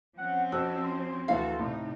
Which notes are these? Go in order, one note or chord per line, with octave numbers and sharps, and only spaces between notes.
F3 C4 C#4 F#5
F2 F#4 E6
C6
D2 E3 F#4 A4 F5
A2 C3 D#4